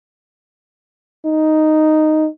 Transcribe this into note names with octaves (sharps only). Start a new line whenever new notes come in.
D#4